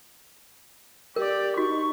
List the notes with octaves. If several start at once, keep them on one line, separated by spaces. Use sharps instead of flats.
G4 A#4 D5
D#4 F#4 C#6